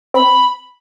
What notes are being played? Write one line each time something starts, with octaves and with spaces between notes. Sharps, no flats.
C4 B5